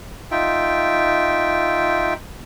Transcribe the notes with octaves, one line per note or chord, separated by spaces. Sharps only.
D#4 F4 E5 G5